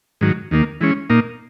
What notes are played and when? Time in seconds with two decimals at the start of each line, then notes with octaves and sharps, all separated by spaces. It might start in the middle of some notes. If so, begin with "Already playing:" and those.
0.21 G#2 D#3 F#3
0.51 D#2 D#3 A#3
0.81 E3 G#3 C#4
1.10 A#2 A#3 D#4